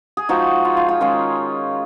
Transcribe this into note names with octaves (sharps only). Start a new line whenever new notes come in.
G#4
F3 G#3 D#4 F#4
F4
F4
F4
D#3 G#3 C#4 F4